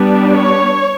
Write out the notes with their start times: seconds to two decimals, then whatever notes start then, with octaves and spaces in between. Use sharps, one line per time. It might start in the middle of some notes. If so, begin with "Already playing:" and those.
Already playing: G3 B3 D4
0.32 C#5